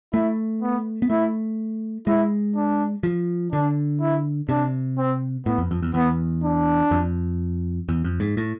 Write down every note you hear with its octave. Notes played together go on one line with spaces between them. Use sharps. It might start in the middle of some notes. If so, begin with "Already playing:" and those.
A3 E4
B3
B3
A3 E4
G#3 E4
D4
F3
D3 D4
E4
C3 D4
C4
A2 B3
F2
F2
E2
E2 B3
D4
F2
E2
F2
G#2
A2